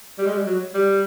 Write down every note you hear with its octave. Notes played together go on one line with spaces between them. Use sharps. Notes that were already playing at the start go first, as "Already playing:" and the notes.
G3
G#3
G3
F#3
G3